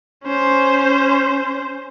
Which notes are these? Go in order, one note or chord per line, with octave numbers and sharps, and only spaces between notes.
C#4 C5